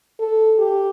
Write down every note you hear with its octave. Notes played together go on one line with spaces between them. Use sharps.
A4
G4